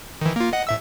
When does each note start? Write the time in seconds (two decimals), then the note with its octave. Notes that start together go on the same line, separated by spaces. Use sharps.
0.21 D#3 E3
0.36 A#3 F4
0.53 D#5 F#5
0.67 A2 E5 E6